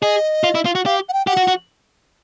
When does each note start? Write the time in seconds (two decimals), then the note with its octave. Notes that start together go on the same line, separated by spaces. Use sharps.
0.02 G#4 D#5
0.44 F4
0.55 E4
0.65 F4
0.75 F#4
0.86 G4 F5
1.09 F#5
1.13 G5
1.27 G4 F#5
1.37 F#4
1.48 F#4